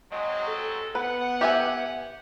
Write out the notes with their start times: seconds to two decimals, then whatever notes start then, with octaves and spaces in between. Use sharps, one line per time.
0.12 F#3 G#3 C4 D#5
0.47 A4
0.95 B3 B4 F#5
1.41 G4 E5 G#5